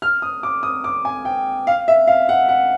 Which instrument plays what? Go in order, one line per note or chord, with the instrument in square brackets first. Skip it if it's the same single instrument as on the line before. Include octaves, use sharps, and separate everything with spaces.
[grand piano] F6
D#6
D6
D#6
D6
G#5
G5
F5
E5
F5
F#5
F#5